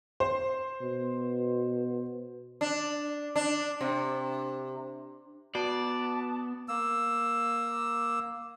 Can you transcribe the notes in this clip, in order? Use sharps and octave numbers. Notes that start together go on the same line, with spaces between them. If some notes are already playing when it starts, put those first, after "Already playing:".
C5
B2
D4
D4
C3
B3 F#4 D5 A5
A#3 E6